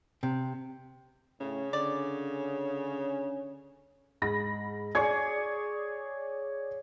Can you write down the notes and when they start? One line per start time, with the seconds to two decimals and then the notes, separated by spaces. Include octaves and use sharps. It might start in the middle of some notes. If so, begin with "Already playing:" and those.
0.23 C3
1.41 A2 C#3 C#4
1.73 D3 C#4 D5
4.22 G#2 B5 A#6
4.95 G#4 C#5 D5 G#6